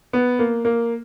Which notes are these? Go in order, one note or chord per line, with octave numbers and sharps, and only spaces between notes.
B3
A#3
A#3